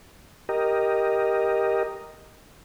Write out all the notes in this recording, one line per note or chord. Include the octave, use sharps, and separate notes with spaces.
G4 A#4 D#5